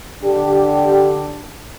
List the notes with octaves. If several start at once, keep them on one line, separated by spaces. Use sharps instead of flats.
D3 D4 G4